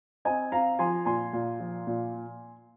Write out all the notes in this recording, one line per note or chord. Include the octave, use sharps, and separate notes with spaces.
C4 D#5 G#5
C4 F5 A#5
F3 G#5 C6
A#2 G#5 C6
A#2
F3
A#2